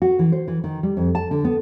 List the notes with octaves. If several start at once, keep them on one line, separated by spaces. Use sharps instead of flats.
F#4
E3
C5
E3
D#3
G3
F2
A5
D3
B3